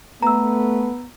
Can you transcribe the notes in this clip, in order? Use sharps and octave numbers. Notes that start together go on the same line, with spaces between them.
A3 B3 A#5 E6